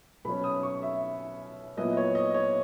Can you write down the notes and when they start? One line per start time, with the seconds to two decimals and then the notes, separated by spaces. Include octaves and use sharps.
0.25 B2 F#3 C#4 B5
0.44 D#6
0.63 C#6
0.82 E5
1.77 A#2 F#3 B3 E4 D#5
1.97 C#5
2.15 D#5
2.34 C#5